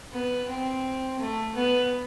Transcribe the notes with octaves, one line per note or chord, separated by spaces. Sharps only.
B3
C4
A3
B3